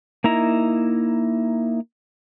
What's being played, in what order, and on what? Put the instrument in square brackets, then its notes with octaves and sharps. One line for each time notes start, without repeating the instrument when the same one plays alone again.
[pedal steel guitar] A#3 D#4 E4 A#5